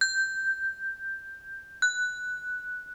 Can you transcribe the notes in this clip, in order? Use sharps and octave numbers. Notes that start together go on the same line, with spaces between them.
G6
F#6